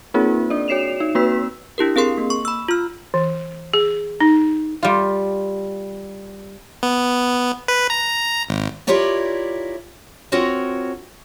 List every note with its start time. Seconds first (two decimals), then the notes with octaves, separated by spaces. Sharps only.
0.14 A#3 C4 D#4 F4 G#4 A#4
0.50 D4 D5
0.68 F#4 C#5 C7 E7 F7
1.00 D#4
1.15 A#3 C4 F#4 B4 E6 B6
1.78 D4 E4 G4 A#4
1.96 C4 G#4 A#4 C6 C7
2.18 A#3
2.30 C#6
2.45 B5 E6
2.69 F4 F6
3.14 E3
3.74 G#4
4.20 D#4
4.83 G3 F4
6.83 B3
7.68 B4
7.90 A#5
8.49 G#1
8.87 E4 F4 G4 A#4 C#5 D5
10.32 C4 F4 F#4 A#4 C#5